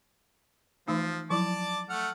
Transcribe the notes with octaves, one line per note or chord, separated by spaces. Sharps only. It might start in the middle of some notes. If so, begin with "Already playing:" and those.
E3 F3 A3 D#4
F3 F#3 E4 D5 A5 D6
A3 F#5 F6